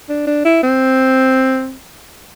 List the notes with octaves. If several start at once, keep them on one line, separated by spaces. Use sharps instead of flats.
D4
D4
E4
C4